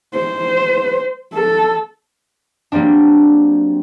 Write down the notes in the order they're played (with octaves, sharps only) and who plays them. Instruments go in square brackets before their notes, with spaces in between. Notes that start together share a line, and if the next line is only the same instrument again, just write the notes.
[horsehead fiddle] C5
A4
[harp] F#3 G3 A#3 C4 D4